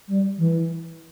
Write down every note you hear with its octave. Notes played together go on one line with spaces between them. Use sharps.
G3
E3